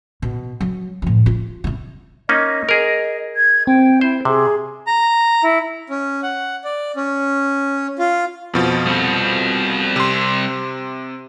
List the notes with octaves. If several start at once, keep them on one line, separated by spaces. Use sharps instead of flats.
B2
F#3
A2 F3
F4
C3 E4
A#3 C#4 D#4 D#5
G#4 A#4
G#6
C4 G5
E4 C5
C3 G#4
A#5
E4
C#4
F#5
D5
C#4
F4
F2 B2 F3
G3 C4
C3 C6